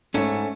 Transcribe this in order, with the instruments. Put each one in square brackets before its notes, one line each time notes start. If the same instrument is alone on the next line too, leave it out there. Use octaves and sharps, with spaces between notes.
[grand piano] G#2 [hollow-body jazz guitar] A3 C#4